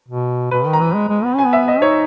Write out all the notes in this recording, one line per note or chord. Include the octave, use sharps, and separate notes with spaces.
B2
B2 B4
D#3
A#5
E3
G#3
G#3
B3
C#4 G#5
B3
E5
D#5
D#4 C#5